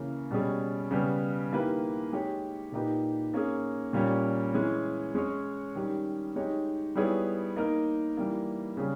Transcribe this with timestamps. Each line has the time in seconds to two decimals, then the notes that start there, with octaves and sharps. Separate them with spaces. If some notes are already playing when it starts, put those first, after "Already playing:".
Already playing: C#3 E3 A#3
0.31 B2 G3 C#4 G#4
0.91 C#3 G3 B3
1.52 D#3 A#3 E4 G4 B4
2.13 G#3 D#4 G4 C#5
2.72 A#2 A#3 D#4 G4 B4
3.34 A#3 C#4 G#4
3.93 A#2 G3 A#3 C#4
4.54 E3 G#3 C#4 G#4
5.15 G#3 C#4 G#4 C#5
5.75 D#3 G3 C#4 G4
6.36 G#3 D#4 G4 C#5
6.95 G3 B3 E4 G#4 C#5
7.56 A#3 D#4 A#4
8.17 E3 G3 A#3
8.77 C#3 G3 C#4 G#4